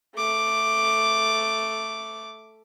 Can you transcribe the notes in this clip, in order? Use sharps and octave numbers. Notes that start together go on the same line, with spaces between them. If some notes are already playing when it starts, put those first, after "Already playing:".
A3 D6